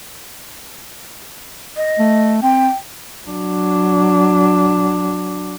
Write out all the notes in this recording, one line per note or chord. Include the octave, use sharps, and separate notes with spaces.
D#5
A3
C4 G5
F#3 D4